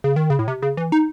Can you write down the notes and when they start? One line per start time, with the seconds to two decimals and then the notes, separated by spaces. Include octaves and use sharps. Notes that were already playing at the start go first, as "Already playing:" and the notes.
0.04 C#3
0.16 D#3
0.30 C#3
0.39 A2
0.48 C3
0.62 C#3
0.77 E3
0.92 D#4